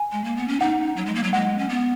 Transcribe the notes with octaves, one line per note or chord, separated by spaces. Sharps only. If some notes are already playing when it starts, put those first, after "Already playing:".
Already playing: G#5
G#3
A#3
B3
C#4
D#4 F#5
F#3
G#3
A#3
F#3
G#3 F#5
C#4
B3